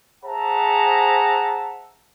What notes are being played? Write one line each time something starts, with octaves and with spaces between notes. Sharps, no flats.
G#4 C5 E5 F#5 A5 A#5